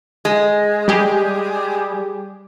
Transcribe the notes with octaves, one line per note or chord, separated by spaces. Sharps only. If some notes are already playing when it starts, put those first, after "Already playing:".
G#3
G3 G4 G#4